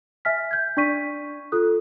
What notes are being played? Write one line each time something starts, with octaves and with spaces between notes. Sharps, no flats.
E5 G#5 F6 B6
G6 G#6
D4 D5 C#6 B6 D#7
F4 A4 D#6 F#6